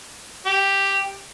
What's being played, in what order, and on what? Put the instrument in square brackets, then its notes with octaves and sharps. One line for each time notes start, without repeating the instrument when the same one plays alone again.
[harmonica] G4